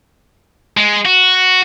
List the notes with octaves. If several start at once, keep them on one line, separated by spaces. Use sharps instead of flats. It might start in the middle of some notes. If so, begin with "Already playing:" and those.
G#3
F#4